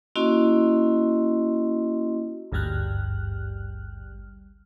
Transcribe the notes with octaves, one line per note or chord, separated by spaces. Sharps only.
A#3 C#4 E4 F#4 D#5 C6
G#1 D2 G2 G3 F6 F#6